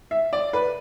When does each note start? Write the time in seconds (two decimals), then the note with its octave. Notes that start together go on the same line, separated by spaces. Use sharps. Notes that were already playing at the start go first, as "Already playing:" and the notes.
0.11 E5
0.33 D5
0.53 B4